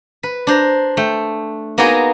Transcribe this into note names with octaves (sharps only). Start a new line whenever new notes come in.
B4
D4 C5 A#5
A3 G5
A#3 B3 D#4 F#4 G#4 D#5